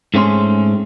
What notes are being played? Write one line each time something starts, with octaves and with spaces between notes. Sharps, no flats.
G#2 A3 C4 C#4 G#4 C6